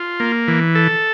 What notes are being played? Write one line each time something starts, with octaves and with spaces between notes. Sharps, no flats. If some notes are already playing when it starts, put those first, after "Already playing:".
Already playing: F4
A#3
E3
A4